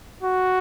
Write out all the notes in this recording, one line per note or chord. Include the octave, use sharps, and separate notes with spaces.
F#4